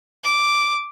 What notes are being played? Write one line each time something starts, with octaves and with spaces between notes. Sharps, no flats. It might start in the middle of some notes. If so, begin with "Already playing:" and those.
D6